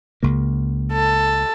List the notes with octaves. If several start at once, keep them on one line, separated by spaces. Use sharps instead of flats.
C#2 C#3 A#3
A4